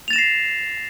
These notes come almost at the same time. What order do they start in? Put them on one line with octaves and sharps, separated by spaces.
F7 A6 E7 A#6 C7